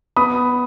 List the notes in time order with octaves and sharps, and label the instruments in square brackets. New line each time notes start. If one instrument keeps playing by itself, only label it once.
[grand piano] B3 B5 D#6